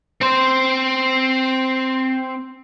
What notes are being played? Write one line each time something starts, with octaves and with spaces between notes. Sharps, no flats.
C4 C5